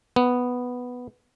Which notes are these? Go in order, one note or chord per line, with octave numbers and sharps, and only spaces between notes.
B3